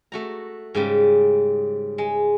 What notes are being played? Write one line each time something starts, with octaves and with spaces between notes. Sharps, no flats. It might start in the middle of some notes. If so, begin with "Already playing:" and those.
A3 F#4 A#5
G#2 C#3 G3
G#3